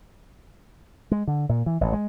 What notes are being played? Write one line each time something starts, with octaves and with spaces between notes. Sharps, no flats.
G#3
D3
A#2
E3
A1
G#3